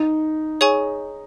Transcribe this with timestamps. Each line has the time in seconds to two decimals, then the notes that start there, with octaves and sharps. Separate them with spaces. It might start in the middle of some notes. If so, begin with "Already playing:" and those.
Already playing: D#4
0.61 G#4 C#5 G#5 C#6